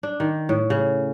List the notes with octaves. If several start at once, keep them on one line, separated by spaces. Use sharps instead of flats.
D4
D#3
A2
C#3